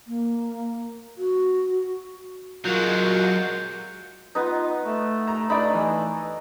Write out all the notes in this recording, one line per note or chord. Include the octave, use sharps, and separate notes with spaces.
A#3
F#4
F#3 G#3 F4 F#4 A#4 G6
B3 D#4 F4
A3
A#5
A3 D4 D#4 D5 B5
E3